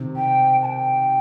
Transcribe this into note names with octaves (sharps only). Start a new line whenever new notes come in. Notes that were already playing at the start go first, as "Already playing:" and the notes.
Already playing: C3 D#3
G5
A5
G5